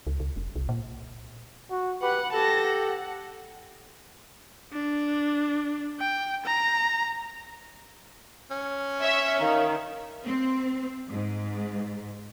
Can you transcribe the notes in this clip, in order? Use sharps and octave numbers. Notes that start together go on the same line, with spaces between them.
C#2
C#2
F1
C2
A#2
F#4
G4 B4 F#5 F#6
G4 A4 A5 A#6
F#5
D4
G5
A#5
C#4
C#5 E5
D#3 A#4 F5 A#5
C4
G#2